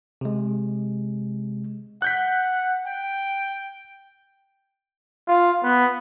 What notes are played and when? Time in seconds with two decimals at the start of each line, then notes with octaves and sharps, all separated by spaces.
0.21 C3 G#3
2.02 F#5 F#6 G6 B6
2.87 G5
5.28 F4
5.64 B3